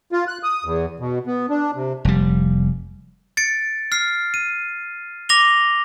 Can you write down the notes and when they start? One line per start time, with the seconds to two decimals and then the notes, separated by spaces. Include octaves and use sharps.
0.12 F4
0.27 F#6
0.43 D#6
0.65 E2
1.00 B2
1.27 B3
1.50 D4
1.75 C3
2.05 F1 G3
3.37 A6 C#7 D7
3.92 F6 C7
4.34 D#7
5.29 D6 A#6 F7 G7